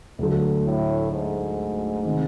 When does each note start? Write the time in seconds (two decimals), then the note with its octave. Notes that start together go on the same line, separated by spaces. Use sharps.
0.19 D2 D3 F#3 A3
0.66 A2
1.12 G#2
2.05 C3 D#3